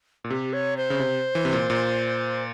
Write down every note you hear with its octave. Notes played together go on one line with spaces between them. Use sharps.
A#2
C3 G4
C#5
C5
C#3
C3
E3
C3
A#2
A#2